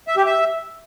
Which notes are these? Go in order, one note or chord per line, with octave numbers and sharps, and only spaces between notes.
E5
G4
E5